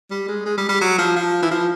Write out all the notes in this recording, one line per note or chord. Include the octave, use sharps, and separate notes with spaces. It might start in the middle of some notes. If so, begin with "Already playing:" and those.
G3
G#3
G#3
G3
G3
F#3
F3
F3
E3
F3